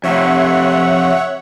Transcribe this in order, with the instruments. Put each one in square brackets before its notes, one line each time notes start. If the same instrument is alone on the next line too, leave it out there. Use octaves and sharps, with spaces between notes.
[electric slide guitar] F2 C3 [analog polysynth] C#5 E5 F#5